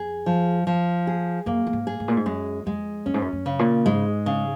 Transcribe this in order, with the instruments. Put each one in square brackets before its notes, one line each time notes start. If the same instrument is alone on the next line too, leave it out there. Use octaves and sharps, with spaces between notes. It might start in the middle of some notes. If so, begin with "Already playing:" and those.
Already playing: [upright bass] F2 [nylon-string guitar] G#4
[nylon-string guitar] F3
F3
G#4
[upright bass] F#2 [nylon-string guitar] A#3
[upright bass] F#2
G#2
[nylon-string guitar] G#4
[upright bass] G#2
A#2
G#2
[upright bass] F#2 [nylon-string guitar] G#3
[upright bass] F2 [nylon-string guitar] G#3
[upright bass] F#2 [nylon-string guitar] C#4
[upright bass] G#2
F#2
F#2
[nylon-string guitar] C#3
[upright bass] A#2
[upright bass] G#2 [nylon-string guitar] G#3
[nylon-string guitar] C#3